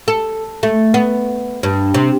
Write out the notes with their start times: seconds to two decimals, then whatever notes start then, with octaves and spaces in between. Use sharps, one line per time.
0.08 A4
0.63 A3
0.94 B3
1.63 G2
1.94 C3